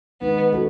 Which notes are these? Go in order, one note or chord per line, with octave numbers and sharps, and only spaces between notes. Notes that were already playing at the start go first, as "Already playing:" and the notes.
D#3 G#3 B3 D#4
C#4 F#4 A4